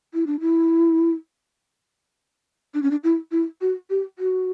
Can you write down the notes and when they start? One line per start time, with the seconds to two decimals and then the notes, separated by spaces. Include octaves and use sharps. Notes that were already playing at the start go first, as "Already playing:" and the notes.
0.14 E4
0.27 D4
0.40 E4
2.74 D4
2.83 C#4
2.91 D4
3.04 E4
3.32 E4
3.61 F#4
3.90 G4
4.19 F#4